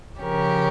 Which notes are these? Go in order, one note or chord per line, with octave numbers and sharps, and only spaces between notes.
C#3 F3 C#4 G4 A#4